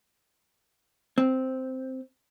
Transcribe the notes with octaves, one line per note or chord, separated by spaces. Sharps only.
C4